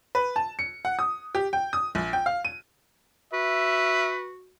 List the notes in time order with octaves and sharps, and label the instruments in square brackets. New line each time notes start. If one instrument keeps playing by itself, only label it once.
[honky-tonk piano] B4
A5
C#7
F#5
D#6
G4
G5
D#6
A#1
G5
F5
D#7
[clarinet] F#4 [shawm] B4 [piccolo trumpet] E5